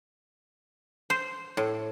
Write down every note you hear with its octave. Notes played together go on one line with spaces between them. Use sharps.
C5
A2